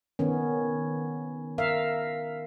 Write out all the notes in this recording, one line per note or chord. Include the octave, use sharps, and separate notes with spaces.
D#3 B3 C#4
A#4 E5 F5